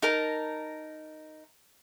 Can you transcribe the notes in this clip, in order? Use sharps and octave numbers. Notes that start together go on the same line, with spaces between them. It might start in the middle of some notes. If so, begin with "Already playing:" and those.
D#4 A#4 A5